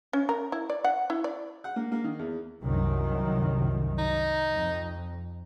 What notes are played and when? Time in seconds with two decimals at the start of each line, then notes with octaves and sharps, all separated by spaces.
0.13 C#4
0.29 A#4
0.52 E4
0.70 D5
0.84 F#5
1.10 E4
1.24 D5
1.64 F#5
1.76 A#3
1.92 A#3
2.04 D#3
2.19 E2
2.62 C2 F#2 D#3
3.98 D#4
4.51 F2